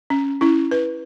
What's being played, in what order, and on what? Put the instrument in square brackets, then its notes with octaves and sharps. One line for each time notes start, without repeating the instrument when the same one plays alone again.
[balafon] C#4
C#4 E4
B4